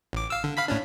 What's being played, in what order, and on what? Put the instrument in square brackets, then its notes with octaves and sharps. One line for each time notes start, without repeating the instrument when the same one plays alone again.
[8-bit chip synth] A1 D6
F5 E6
D3
F5 B5 B6
A2 C#4 D4